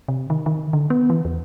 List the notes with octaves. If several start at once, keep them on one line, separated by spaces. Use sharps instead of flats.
C3
D#3
D#3
D3
B3
E3
E2